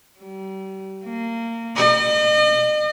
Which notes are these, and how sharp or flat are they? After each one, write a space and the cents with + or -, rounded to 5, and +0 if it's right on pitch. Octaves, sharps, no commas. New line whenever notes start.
G3 -35
A#3 -25
D#5 -40